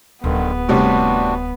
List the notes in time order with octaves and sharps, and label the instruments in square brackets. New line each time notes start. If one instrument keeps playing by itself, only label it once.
[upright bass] D1 [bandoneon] G2 D3 D#3 [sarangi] B3
[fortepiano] A2 C3 G3 [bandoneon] D4 F#4